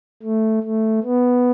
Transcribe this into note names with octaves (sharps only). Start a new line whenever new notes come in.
A3
A3
B3